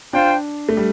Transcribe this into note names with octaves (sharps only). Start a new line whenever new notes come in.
D4 F4 C5 G5
A3
G3